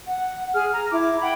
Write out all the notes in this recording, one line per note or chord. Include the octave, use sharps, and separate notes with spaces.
F#5
G#4 F6
A#5
E4 D6
F#5 G5 B5